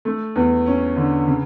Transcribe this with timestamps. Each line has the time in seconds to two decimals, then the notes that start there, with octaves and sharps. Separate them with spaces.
0.05 A3
0.36 E2
0.66 C#4
0.96 D3
1.27 C#3